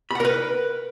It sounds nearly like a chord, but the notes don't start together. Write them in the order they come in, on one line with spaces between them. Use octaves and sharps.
B5 F#5 A#4 B4